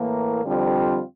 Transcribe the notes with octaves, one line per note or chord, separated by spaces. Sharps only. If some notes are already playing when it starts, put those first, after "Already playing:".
Already playing: A2 E3 A#3
F2 D3 G3 C4 F4